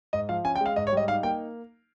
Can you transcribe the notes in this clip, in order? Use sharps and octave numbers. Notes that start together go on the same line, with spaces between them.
G#2 D#5
F3 F5
C#4 G#5
G5
G#3 F5
G#2 D#5
C#5
G3 D#5
D#4 F5
A#3 G5